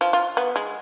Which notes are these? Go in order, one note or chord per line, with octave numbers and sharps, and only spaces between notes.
F3
F4
B3
G#3